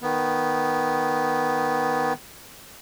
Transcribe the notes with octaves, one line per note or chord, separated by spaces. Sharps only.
D#3 B3